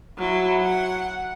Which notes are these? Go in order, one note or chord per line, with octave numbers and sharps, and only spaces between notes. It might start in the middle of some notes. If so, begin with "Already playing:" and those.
F#3 E4
F#5